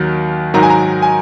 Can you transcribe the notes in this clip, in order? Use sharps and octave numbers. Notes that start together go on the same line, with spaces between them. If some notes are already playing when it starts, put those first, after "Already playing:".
Already playing: D#2 D#3 F#3
G#2 D#3 F#3 A#5
G#5
A#5
G#5